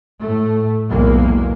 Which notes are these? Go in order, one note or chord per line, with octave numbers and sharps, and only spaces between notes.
A2 A3
B1 E2 G#3 A#3